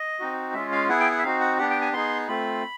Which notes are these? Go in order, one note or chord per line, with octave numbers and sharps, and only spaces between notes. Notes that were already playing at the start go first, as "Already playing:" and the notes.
Already playing: D#5
C4 D#4 F#4
G#3 C#4 F4 E5
F5
B3 E4 G#4 F#5
G5
F#5
E5
C4 D#4 F#4 F5
F#5
B3 D4 G4 F#5
G5
G#5
B3 D#4 G#4 C6
A3 C4 F4 B5